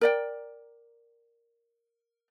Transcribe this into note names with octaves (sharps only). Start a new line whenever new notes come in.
A#4 D5 G5